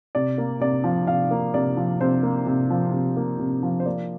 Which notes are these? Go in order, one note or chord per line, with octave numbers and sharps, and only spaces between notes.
C3 D5
A#3
C3 D5
F3
C3 F5
A#3
C3 D5
F3
C3 C5
A#3
C3
F3
C3
A#3
C3
F3
C5
A#3 D5